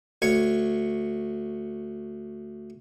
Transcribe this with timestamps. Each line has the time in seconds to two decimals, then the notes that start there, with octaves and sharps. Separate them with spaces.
0.22 D2 C#5 C#6